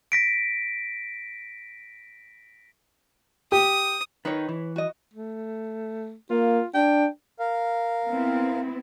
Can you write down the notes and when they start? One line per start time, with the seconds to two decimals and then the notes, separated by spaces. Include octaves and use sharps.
0.12 A#6 B6 D7
3.52 G4 D#6
4.25 D#3 D#4 B4 C#5
4.49 E3
4.76 F#4 D#5
5.13 A3
6.30 A#3 F4
6.75 D4 G5
7.39 A#4 F5
8.06 B3 C4 E4